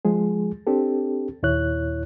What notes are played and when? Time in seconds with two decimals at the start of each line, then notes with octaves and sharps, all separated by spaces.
0.05 F3 G#3 G#4
0.67 C4 D4 G4 A4
1.43 D#2 A#2 E4 C#5 F#6